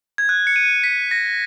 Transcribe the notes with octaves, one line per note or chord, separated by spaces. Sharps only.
G#6
F#6
C#7
D#7
B6
A#6